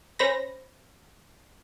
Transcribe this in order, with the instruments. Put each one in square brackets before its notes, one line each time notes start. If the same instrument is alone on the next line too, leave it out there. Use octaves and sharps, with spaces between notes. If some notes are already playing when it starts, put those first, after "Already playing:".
[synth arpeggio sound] C#4 C5 B5 A#6